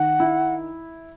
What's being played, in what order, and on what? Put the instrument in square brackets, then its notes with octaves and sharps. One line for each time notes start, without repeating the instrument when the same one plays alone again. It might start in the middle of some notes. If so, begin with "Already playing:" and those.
Already playing: [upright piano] D#3 [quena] F#5
[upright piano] E4